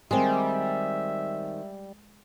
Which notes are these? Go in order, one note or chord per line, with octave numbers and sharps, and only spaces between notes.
D#3 G3 G#3 C4 E5